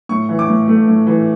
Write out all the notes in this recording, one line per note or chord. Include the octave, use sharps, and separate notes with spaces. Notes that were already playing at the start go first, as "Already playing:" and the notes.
A2 C#6
E3
D6
A2
A3
A2
E3